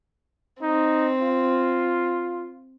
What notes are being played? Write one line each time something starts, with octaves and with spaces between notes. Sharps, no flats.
C4 D#4
F4